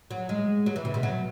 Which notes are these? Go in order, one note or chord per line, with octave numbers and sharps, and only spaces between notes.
F#3
G#3
F#3
E3
C#3
B2
F#3